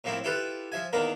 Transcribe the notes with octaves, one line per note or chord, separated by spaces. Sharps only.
A2 F3 A#3 C4 E4
E4 F4 G4 A4 B4
F3 E5 G#5
E2 D#3 A#3 A#4 B5